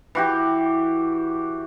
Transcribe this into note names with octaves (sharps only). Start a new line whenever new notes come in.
E3 F#4 G4